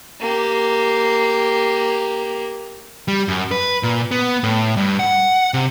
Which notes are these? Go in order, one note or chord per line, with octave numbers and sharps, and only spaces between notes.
A#3 G4
G3
F#2
B4
A#2
B3
A2
G2
F#5
C3